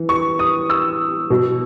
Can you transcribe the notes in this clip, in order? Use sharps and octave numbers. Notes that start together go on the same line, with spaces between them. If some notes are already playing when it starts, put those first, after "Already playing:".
Already playing: E3
C#6
D#6
E6
B2 F#3